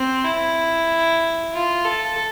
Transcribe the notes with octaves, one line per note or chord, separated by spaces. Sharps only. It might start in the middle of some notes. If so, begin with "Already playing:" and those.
Already playing: C4
E4
F4
A4